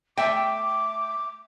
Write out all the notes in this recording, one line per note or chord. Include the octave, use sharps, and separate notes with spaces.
A3 E5 G5 D6